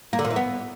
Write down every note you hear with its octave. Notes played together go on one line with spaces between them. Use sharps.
A#3
D3
A#2
E3
B3